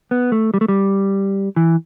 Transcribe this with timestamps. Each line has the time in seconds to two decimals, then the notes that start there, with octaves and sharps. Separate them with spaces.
0.11 B3
0.32 A3
0.54 G3
0.61 A3
0.68 G3
1.56 E3